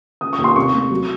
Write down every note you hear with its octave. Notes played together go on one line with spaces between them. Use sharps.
C#3 D#6
C#6
D#2
C6
C2 C#6
A3
F#3